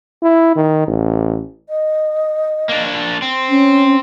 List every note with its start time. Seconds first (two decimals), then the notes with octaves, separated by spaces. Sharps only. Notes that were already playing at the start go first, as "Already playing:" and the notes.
0.23 E4
0.56 D#3
0.88 A1
1.69 D#5
2.69 A#3 D4
3.22 C4
3.50 C#4